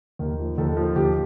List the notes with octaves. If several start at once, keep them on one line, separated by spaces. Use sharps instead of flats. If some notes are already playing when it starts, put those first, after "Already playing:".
D#2 A#4
F3
D#2 A4
F3
D#2 G4